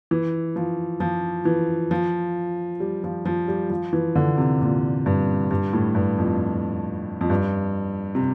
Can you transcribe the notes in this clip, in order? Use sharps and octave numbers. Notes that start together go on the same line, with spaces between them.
E3
F3
F3
E3
F3
G3
F3
F3
G3
F3
E3
D3
C3
A#2
G2
G2
A2
G2
F2
F2
G2
C3